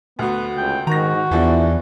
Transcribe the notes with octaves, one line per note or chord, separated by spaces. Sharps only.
D2 B3 F#4
C#2 G5
G#2 D#3 F#4 A#5 A#6
E2 E3 F3 D4 E4